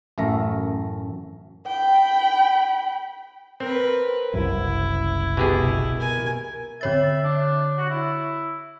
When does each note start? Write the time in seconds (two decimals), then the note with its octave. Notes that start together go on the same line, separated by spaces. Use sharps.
0.18 A1 F#2 A3 A#4 E5 A#5
1.67 G5 B5
3.60 C4 A#4 B4
4.33 F#1 C2 E4
5.37 B2 G4 G#4
5.98 A#4 G#5
6.81 D3 C#5 E5 A6
7.24 D4
7.78 F#4
7.90 E4